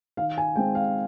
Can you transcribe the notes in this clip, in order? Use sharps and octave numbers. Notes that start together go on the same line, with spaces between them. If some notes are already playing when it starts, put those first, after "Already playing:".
D#3 F5
G#5
G#3 C4 G5
F5